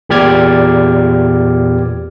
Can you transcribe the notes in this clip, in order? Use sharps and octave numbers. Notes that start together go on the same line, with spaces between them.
E2 A#2 G4 D5 F6 G#6